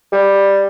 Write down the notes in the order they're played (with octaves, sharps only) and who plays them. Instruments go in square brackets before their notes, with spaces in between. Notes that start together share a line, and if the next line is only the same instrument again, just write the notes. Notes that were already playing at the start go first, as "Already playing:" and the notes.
[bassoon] G3